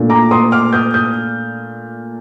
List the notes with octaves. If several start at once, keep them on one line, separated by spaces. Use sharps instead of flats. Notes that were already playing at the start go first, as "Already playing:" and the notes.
Already playing: A#2 A3 D4
A#5 D6
C6 D#6
D6 F6
D#6 G6
D#6 G6